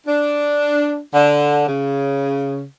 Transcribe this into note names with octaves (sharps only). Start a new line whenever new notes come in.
D4
D3
C#3